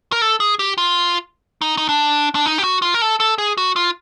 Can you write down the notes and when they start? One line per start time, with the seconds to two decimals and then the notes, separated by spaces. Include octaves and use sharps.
0.12 A#4
0.22 A4
0.40 G#4
0.59 G4
0.78 F4
1.62 D#4
1.78 D#4
1.89 D4
2.35 D4
2.46 D#4
2.58 G4
2.64 F#4
2.82 F4
2.94 A#4
3.02 A4
3.20 A4
3.38 G#4
3.58 F#4
3.76 F4